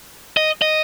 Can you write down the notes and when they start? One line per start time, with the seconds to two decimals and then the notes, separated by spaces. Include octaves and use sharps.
0.37 D#5
0.62 D#5